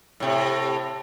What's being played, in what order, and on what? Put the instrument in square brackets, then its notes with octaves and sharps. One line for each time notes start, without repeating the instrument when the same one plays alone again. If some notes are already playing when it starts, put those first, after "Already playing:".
[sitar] A2 C3